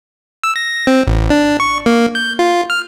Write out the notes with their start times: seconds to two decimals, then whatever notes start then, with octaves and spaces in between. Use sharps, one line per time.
0.44 E6
0.56 A#6
0.87 C4
1.07 A1
1.30 D4
1.60 C#6
1.86 A#3
2.15 G6
2.39 F4
2.70 F6